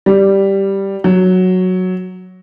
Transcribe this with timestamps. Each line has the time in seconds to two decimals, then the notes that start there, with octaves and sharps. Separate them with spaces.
0.06 G3
1.04 F#3